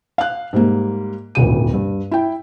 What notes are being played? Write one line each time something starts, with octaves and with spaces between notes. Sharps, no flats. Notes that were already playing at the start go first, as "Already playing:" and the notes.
F5 F#6
G#2 G3 A#3
D#1 G#1 D2 D#7
G2
E4 G5